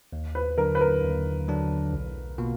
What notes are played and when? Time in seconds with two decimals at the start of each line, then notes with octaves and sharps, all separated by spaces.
0.12 D#2
0.35 B4
0.58 D3 F#3 D4 A#4
0.75 B4
0.81 A#4
1.03 D#2
1.48 D3 F#3 D4
1.93 B1
2.38 B2 A#3 F4